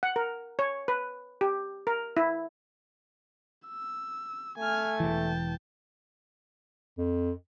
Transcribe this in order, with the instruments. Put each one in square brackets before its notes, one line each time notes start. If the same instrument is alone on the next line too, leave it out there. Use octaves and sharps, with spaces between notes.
[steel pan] F#5
A#4
C#5
B4
G4
A#4
E4
[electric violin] E6
[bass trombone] A3 [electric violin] G#5 F6
[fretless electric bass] E1 E3 [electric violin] G5 A5
[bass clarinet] F2